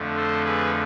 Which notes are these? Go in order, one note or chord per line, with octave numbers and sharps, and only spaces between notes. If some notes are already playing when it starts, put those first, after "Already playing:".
Already playing: F2 D3 A3
A4 C5
G#4 B4